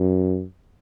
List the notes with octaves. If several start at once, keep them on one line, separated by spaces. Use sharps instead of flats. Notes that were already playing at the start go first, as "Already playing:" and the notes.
Already playing: F#2